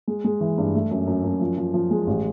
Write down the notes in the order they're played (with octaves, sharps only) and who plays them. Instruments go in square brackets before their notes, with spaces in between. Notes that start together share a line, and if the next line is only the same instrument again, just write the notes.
[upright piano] G#3
G#3
E3
G2
A3
F#2
F#2
F#2
F3
F3
F3
G#3
A1